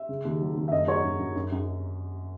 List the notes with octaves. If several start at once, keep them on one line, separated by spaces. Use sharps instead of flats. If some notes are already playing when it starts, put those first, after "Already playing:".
Already playing: E5
C#3
D#2
F#3
D#2
E5
F#2 D#5
F#3 C#5
F#2
F#2
F#2
F#2